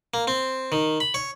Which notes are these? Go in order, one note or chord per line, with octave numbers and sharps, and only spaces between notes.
A#3
C4
D#3
B5
C#5